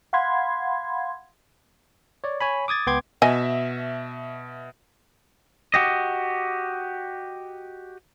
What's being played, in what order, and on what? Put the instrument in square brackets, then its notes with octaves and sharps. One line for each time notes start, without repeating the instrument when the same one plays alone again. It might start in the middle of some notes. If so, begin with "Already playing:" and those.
[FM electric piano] F5 F#5 B5 C6 G#6
[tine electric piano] C#5 D5
C#5 G#5 B5
D6 D#6 G#6 A6
C#2 B3 G5 C6 D6 G#6
[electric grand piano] B2 E5 [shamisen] D#5 G#5
[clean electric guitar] F#4 G4 D#5